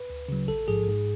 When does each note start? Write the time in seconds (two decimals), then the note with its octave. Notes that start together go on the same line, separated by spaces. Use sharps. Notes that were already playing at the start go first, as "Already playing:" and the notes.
Already playing: B4
0.10 D2
0.28 C#3 F#3
0.48 A1 A4
0.68 G#2 F3 G#4
0.88 G#2